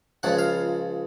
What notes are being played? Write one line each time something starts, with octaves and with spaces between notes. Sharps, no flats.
C#2 C#3 F3 F#5
F5